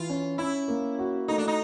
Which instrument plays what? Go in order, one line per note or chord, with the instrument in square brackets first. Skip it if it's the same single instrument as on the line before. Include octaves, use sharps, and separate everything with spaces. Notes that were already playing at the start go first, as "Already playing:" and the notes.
Already playing: [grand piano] E3 [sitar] F4
[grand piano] C#4
[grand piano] C#4 [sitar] E4
[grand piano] A#3
F#4
[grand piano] A3 [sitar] D#4
[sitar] D4
D#4